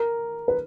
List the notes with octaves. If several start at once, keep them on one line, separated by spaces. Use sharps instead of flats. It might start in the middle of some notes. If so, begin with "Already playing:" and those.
Already playing: A#4
B4